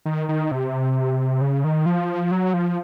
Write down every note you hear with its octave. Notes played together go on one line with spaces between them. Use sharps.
D#3
D#3
C3
C#3
D#3
F3
F#3
F3